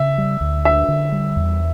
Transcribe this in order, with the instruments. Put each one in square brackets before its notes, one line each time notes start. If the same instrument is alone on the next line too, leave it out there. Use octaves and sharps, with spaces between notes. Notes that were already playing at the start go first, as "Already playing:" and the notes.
Already playing: [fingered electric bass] C#3 [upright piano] E5
[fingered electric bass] G3
D2
[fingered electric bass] D4 [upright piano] E5
[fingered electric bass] D3
G3
E2